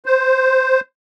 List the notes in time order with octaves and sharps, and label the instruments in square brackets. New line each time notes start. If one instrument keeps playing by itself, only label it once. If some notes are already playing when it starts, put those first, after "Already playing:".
[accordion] C5